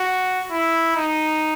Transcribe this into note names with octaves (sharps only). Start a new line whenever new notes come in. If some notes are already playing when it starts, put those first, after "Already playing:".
Already playing: F#4
E4
D#4